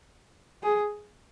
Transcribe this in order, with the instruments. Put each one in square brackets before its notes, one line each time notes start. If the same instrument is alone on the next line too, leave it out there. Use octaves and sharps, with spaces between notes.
[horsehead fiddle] G#4